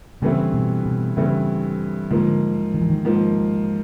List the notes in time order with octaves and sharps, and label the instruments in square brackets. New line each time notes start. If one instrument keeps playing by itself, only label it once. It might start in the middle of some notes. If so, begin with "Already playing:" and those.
[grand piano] G2 E3 A3 C4 E4 [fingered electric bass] C#3
[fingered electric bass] B2
B2
[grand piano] G2 E3 A3 C4 E4 [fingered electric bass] C#3
[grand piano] G#2 F3 A#3 [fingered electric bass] D3
[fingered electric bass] D#3
E3
D#3
[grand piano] G#2 F3 A#3